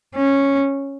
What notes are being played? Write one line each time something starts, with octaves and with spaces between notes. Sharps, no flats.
C#4